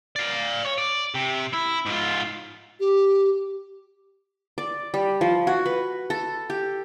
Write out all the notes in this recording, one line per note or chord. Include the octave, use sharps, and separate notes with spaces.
D5 F5
C#5
D5
C3
E4
G#2 F4
G4
D5
G3
F3
F#4
B4
A4
G4